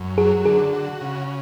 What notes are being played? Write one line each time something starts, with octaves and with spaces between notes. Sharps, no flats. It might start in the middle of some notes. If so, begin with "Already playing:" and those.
Already playing: F#2
F#3 G#4
D3 G#4
F#4
C#3